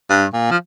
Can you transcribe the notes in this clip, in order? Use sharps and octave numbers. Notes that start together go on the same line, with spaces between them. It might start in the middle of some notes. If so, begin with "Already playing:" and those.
G2
A#2
F3